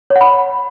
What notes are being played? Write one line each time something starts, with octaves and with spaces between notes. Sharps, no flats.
C#5
F#5
B5